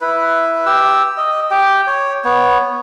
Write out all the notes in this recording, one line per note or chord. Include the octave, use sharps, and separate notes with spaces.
E4 B4
G4 E6
D#5
G4 G5
C#5
B3 C#5